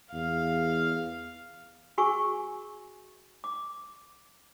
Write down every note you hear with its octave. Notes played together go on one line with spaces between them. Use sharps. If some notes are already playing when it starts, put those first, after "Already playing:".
E2 F5
F#4 G#4 G#5 C#6 E6
D6